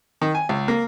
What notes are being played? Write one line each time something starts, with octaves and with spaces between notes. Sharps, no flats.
D#3
G#5
C#2
A#3